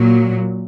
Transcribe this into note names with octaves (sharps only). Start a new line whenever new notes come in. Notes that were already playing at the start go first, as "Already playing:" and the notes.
Already playing: A#2 F#3